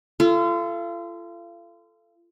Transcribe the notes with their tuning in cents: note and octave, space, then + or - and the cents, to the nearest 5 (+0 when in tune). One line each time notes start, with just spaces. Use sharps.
F4 -35 A4 +0